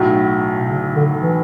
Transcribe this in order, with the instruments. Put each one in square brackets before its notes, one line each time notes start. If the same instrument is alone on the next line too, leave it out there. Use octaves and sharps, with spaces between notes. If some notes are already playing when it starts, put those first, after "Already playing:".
Already playing: [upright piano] B1 A2 F#3
[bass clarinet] B2
C#3
D3
E3